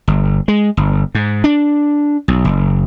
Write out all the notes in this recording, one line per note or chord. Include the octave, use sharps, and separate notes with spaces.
G1
G#3
G1
G#2
D4
B1
F#1